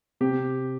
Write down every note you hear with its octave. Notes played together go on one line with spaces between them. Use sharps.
C3 G4